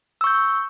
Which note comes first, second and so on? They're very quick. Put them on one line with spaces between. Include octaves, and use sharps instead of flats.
E6 C#6 G6